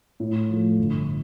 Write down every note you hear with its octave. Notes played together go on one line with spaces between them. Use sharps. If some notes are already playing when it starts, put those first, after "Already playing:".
A2
F3 A3
G1